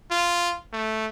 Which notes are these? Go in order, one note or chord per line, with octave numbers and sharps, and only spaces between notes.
F4
A3